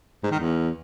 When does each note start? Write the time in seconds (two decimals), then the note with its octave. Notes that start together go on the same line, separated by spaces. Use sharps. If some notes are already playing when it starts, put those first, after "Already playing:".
0.23 G#2
0.31 D#3
0.39 E2